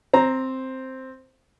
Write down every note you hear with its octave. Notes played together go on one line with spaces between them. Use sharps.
C4 A#5